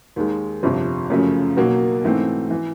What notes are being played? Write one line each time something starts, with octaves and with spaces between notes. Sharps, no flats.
D#2 D#3 G#3
G1 F2 C3 F3
F#2 C#3 F3 A3
B1 B2 F#3 A#3
G#2 E3 A3 C4
E3